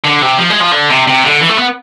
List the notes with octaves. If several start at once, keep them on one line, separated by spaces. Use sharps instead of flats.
D3
C3
F3
G#3
F3
D3
C3
C3
D3
E3
A3
B3